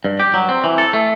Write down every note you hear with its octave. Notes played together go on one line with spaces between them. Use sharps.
G2
G4
F#3
C4
E3
A4
A3